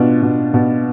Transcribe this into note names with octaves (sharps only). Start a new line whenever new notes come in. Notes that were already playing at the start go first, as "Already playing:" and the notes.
Already playing: B2 D4 F4
B2
B2